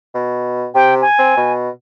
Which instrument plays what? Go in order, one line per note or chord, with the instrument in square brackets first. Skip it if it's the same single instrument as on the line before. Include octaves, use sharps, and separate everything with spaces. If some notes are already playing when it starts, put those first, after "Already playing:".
[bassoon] B2
[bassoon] C3 [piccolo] G5
[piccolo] G#5
[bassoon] C4
B2